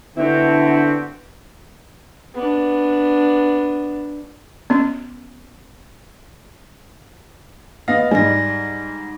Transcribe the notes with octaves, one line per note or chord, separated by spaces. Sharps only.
D3 B3 C4 E4 F#4 G4
B3 D4
B3 C#4
B3 D#5 F5 A#6
G#2 G3 G#5 A#6